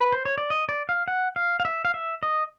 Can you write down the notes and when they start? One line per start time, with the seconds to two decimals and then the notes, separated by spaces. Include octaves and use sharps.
0.00 B4
0.12 C5
0.25 C#5
0.38 D5
0.50 D#5
0.69 D5
0.89 F5
1.08 F#5
1.36 F5
1.60 F5
1.65 E5
1.85 F5
1.94 E5
2.23 D#5